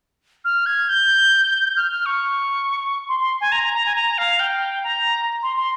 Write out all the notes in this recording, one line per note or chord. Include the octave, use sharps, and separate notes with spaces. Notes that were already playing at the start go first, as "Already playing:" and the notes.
F6
G#6
G6
F6
F6
C#6
C6
C6
G#5
A#5
A#5
A#5
G#5
A#5
F5
G5
A#5
C6
C6